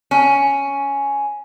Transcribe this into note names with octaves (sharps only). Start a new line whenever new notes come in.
C#4